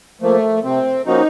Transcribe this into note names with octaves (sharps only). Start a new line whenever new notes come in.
F3 A3 A#3
C3 C4
F3 A#3 C#4 D#4 F#4